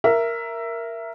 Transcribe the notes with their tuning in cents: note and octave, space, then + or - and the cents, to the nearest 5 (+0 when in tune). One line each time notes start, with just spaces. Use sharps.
A#4 +0 E5 +15